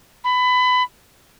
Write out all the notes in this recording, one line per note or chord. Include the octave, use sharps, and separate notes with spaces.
B5